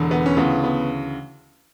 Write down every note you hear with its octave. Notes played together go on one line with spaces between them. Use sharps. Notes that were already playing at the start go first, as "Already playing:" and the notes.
Already playing: E1 E2 D3
B3
C#4
D2 C#3 E3 B3
B3